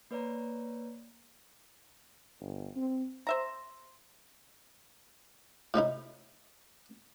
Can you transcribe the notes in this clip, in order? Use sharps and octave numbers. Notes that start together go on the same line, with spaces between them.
A#3 B4 C#5 D5 A#5
G1
C4
C5 E5 A#5
A2 C3 D#4 E4